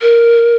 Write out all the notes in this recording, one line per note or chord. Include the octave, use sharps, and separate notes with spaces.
A#4